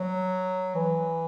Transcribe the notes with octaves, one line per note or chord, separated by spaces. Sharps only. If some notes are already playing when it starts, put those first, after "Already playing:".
Already playing: F#3
E3